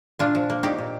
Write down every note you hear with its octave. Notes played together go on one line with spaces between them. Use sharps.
A#2 D4 F4
F3
A#3
A#2 D#4 G4
A#2